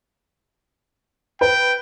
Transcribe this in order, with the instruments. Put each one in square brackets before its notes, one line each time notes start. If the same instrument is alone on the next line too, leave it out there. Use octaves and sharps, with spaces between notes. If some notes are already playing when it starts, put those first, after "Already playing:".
[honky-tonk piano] B4 [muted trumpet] G5